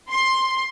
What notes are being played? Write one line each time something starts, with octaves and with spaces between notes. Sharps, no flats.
C6